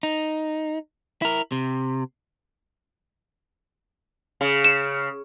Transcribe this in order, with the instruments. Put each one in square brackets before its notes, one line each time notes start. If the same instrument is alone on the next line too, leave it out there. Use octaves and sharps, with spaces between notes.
[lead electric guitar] D#4
E4 A#4
C3
[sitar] C#3
[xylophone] E7